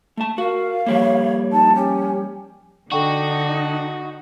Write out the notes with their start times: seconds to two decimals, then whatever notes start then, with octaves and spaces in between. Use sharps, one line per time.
0.17 A3 A5
0.38 F#4 A#4 F5
0.86 F3 G3 A#3 C#5
1.53 D#4 A5
1.75 C#4 G4
2.92 D3 D4 D#4 F#4 A4 G5 C#6